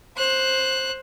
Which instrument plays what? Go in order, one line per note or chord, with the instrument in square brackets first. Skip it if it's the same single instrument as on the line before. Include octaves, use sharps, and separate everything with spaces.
[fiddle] C5 F#6